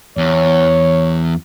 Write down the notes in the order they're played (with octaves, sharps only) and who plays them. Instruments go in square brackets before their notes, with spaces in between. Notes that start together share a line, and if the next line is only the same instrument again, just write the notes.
[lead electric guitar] E2 [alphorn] C#5